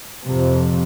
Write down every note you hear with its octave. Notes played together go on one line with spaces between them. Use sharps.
F2 C3